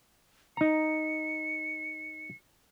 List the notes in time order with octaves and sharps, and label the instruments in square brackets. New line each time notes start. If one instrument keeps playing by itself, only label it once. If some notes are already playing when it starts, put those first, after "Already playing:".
[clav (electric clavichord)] D#4 A#5 [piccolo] C#7